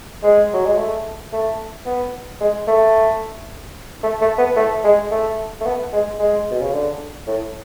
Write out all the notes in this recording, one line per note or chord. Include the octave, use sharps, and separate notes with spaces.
G#3
F#3
G#3
A3
A3
B3
G#3
A3
A3
A3
B3
A3
G#3
A3
A3
B3
G#3
G#3
B2
C#3
D3
A2